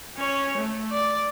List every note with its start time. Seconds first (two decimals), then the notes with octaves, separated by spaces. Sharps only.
0.17 C#4 C#5
0.58 A3
0.91 D5